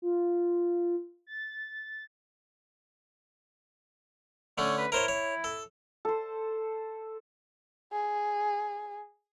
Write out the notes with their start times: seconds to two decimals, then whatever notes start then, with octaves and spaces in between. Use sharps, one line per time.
0.02 F4
1.27 A6
4.58 D3 A3 C#4 C#5
4.78 B4
4.92 E4 A#4 C5 C#5
5.08 C#5
5.44 A4
6.05 A4 C5
7.92 G#4